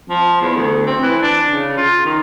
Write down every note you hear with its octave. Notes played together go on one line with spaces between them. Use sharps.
F3
E2
D2
C4
E3
D4
C#3
F4
D#3